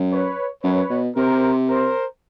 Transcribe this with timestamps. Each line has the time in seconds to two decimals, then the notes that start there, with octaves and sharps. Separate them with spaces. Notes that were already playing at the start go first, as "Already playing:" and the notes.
Already playing: F#2
0.11 B4 C#5
0.63 F#2 B4 C#5
0.90 B2
1.16 C3 A#4 C5
1.68 A#4 C5